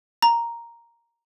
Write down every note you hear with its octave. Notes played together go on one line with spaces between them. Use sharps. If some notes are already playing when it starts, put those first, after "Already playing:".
A#5